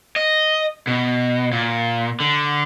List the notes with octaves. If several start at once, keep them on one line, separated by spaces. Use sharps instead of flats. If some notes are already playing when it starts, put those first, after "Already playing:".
D#5
B2
A#2
D3